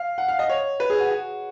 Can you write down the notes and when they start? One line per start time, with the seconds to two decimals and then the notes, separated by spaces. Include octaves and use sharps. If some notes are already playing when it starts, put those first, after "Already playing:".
Already playing: F5
0.18 F#5
0.28 F5
0.39 D#5
0.49 C#5
0.80 B4
0.90 G#4
1.00 F#4
1.11 F#4